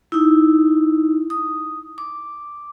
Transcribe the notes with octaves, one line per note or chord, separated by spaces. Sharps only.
D#4 E4
D#6
D6